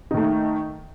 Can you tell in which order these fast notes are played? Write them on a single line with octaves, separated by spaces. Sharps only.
D#4 D#3 A3